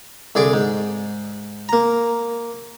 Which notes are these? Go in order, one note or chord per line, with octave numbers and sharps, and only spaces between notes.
C2 D3 G#4 D5 D6
G#2
A#3 A#5